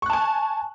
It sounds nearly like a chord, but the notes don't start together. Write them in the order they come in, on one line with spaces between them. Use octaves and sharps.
C#6 F#6 A5 G#5